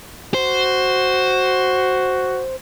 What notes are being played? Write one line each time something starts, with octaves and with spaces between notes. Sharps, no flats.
F#4 C5